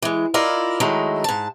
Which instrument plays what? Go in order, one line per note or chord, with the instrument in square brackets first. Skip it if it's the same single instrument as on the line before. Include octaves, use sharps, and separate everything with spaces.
[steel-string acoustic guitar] E3 G#3
E4 F4 A#4 D5 D#5 F5
D#3 F#3 G#3 A3 D#4 E4
G#2 A5